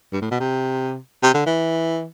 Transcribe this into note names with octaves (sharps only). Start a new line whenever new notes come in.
G2
A2
B2
C3
C3
D3
E3